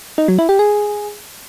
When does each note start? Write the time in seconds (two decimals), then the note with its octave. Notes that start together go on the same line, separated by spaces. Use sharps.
0.18 D#4
0.28 F#3
0.39 E4
0.49 G4
0.59 G#4